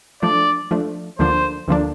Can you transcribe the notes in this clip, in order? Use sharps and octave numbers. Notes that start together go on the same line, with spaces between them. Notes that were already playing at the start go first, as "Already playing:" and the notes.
F3 A3 D4 D5
F3 A3 D4
D2 D3 F3 A#3 D4 C5
D2 D3 F3 A#3 D4